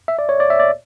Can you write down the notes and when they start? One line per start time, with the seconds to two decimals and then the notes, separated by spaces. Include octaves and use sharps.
0.08 E5
0.19 D5
0.29 C#5
0.40 D5
0.50 E5
0.60 D5